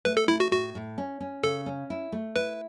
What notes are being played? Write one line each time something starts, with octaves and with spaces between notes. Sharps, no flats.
A3 B4
A4
A3 E4
F#4
A2 F#4
A2
C#4
C#4
C#3 A4
C#4
E4
A3
E4 B4